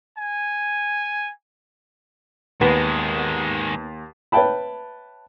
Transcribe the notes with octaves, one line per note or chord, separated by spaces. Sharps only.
G#5
D#2 D#3 G#3 B3
B4 C#5 E5 G5 A5 B5